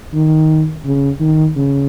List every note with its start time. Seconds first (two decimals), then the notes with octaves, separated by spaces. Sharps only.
0.13 D#3
0.85 C#3
1.20 D#3
1.56 C#3